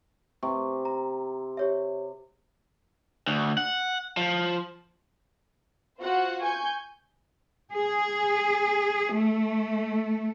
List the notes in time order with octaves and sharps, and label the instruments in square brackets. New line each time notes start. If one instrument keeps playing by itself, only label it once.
[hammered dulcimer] C3 [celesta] C#6
[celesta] A#5
G4 C#5 E5
[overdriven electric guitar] D2
F#5
F3
[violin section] F4 F#4 C5 F#5
G#5 C#6 G6
[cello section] G#4
A3